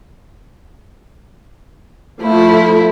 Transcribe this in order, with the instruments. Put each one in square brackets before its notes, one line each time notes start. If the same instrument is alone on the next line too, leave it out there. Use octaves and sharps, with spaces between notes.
[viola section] F3 A3 [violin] E4